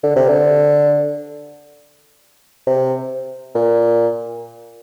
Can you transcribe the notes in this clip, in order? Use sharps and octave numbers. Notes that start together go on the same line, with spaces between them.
D3
C3
D3
C3
A#2